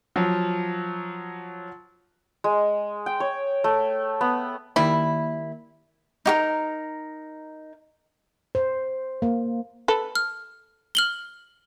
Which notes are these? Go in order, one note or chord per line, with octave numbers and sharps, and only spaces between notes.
F3 F#3
G#3
G5
C#5
A3
B3
D#3 G3 A#3 E4
D#4 G4 A#4
C5
A#3
A4 B4
F6
F6 F#7 G7